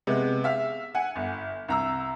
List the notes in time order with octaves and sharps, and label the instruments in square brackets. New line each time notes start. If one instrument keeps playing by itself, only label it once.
[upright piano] C3 G#3 B3
E5 F5
F#5 G#5
G1
C2 A#5 E6